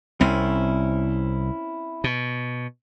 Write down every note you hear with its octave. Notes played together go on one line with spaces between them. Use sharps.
C2 C4 C#4 E4
B2